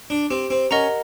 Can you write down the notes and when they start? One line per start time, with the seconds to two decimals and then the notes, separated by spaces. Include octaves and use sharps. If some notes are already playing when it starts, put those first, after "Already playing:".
0.10 D4
0.30 C4 G4
0.50 C4
0.71 C#4 A#4 D#5 F#5 A#5